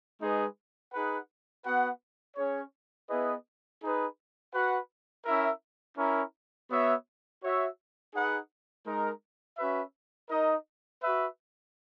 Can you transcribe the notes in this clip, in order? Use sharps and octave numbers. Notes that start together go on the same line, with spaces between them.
G#3 D#4 G#4 B4
D#4 G#4 B4 F#5
B3 F#4 B4 F#5
C#4 G#4 C#5
B3 E4 G#4 B4 D#5
D#4 G#4 B4
F#4 B4 F#5
C#4 E4 A#4 E5
C#4 E4 A#4
B3 F#4 C#5 E5
F#4 C#5 E5
D#4 G#4 B4 F#5
G#3 D#4 A#4
C#4 F#4 B4 E5
D#4 A#4 D#5
F#4 B4 E5